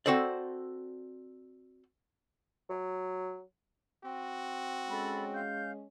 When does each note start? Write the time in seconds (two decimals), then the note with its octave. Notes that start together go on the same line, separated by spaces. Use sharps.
0.06 C4 F#4 A4 C5 D5
2.69 F#3
4.04 C4 F#4
4.89 G#3 C#4 A4 B5
5.34 F5 G6